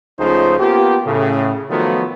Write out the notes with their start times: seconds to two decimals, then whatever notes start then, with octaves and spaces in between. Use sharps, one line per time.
0.19 C#2 C#3 F3 A3 D#4 C5
0.59 A#3 B3 F4 G4
1.06 A2 C#3
1.70 D#3 F3 F#3 A3 B3 F4